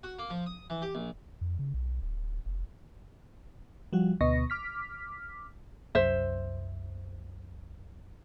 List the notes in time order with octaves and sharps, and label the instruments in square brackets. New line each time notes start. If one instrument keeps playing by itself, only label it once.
[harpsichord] F#4
A#3
F3
D#6
E3
G4
A#1
[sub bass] F2
C#3
B1
D1
F1
[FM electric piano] F3 G3 F#4
D2 B2 B3 D#5 C#6 A#6
D6 F6 B6
[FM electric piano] C2 F#2 [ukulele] C5 E5